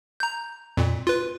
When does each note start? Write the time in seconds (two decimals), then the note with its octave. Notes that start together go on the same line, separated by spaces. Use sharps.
0.20 A#5 G6
0.77 F2 A#2
1.07 F4 B4